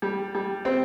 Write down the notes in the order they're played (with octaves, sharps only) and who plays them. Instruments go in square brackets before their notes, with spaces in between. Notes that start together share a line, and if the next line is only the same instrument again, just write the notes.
[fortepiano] G3
G3
C4